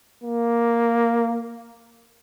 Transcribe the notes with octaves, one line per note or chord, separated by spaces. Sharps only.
A#3